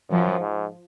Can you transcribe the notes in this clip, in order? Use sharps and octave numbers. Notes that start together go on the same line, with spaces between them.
F#2 F3
G#2